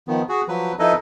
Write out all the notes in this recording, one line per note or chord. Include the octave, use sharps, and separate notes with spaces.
D#3 F3 B3
F#4 G#4
F3 F#3 B4
F3 D#4 E4 A4 B4 D#5